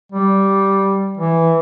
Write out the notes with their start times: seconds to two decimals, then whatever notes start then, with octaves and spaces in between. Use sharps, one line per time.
0.12 G3
1.18 E3